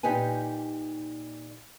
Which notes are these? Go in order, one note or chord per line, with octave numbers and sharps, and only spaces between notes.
A#2 D#4 G4 B4 G#5